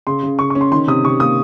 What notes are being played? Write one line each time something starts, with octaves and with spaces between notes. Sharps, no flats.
C#3 C6
C#3
C#3 C#6
C#6
C#4
C6
D#3 C6
C3 D#6
C3 C#6
A#3 D#6